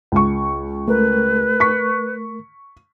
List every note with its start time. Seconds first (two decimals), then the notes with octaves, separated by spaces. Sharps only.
0.12 C#2 C#6
0.88 A3 A#4 B4
1.60 C#6 B6